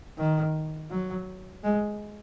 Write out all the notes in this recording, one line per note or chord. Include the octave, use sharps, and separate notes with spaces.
D#3
F#3
G#3